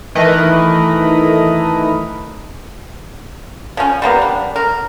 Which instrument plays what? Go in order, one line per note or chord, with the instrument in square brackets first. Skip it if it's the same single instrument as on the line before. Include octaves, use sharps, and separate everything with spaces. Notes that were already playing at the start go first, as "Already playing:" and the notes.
[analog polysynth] D#3 E3 A3 A#4 B4 D#5
[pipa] F3 C#4
G3 A#3 B3
D4
A#4